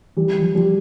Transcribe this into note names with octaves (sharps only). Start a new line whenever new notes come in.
E3 G3
F3
F3 G3